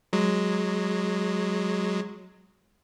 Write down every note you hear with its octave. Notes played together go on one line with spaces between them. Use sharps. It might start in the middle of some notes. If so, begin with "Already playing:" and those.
F#3 G#3